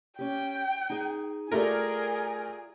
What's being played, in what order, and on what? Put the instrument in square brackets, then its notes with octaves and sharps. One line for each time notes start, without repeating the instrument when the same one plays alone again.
[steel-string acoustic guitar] C#4 G4 [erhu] G5
[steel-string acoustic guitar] D#4 G#4 G#5
[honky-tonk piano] A3 A#4 [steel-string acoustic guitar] F4 G4 D5 [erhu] G#4